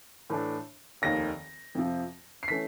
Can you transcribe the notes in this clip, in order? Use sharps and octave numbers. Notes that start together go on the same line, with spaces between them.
A2 E3 A3 D4
F1 D#2 D#3 A#6
F2 C3 F3
C7
E3 A3 C#4 B6